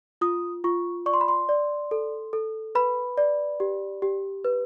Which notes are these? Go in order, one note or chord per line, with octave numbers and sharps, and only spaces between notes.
F4 D#6
F4 C#6
D5 C#6
C6
B5
C6
D5
A4
A4
B4 B5
D5
G4
G4
B4